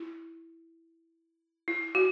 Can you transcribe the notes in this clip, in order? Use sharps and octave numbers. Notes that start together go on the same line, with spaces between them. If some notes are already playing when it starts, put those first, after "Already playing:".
Already playing: E4
E4
F#4